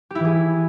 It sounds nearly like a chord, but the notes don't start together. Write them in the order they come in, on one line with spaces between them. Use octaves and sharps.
G4 E4 E3 G#4